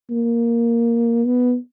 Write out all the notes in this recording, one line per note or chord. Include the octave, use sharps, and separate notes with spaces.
A#3
B3